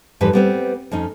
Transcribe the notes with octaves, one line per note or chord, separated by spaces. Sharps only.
F2 G#2 E3 G3 B4
G3 B3 C4
F2 C#4 D#4